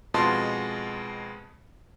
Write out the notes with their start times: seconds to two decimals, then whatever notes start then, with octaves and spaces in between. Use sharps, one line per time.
0.14 F2 B2 G#3 F4 A5 C6